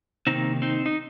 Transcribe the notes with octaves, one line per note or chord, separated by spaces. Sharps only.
C3 D#3 A#3 C4 D#4
C4 D#4
D#4